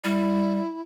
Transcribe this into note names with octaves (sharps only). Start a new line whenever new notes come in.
G3 E4